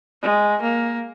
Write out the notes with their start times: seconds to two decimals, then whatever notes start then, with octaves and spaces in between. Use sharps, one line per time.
0.22 G#3
0.62 A#3